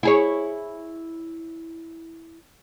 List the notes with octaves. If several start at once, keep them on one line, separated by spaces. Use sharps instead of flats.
E4 G#4 C#5